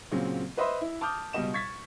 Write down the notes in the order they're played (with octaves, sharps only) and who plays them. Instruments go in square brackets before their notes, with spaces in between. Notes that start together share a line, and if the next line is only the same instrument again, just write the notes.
[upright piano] A#2 C#3 F#3 C4
B4 C5 D#5 E5 B5 C6
E4
A5 D6 D#6 F6 G6
C#2 B2 G3 D#5 E7
C#6 G#6 A6 B6